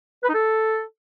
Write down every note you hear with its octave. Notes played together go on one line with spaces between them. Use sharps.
B4
D#4
A4